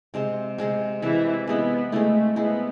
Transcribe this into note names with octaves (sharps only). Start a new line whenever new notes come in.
C3 G#3 C4
C3 G#3 C4
C3 E3 G#3 C4 E4
G#3 B3 C4 E4
G#3 A3 C4 E4
G#3 B3 C4 E4